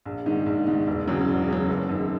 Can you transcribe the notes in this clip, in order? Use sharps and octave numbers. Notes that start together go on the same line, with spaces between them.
A#1
G#2 D#3
A#1
G#2 D#3
E1
E2 C#3 F#3
E1
E2 C#3 F#3
F#1
F#2 D#3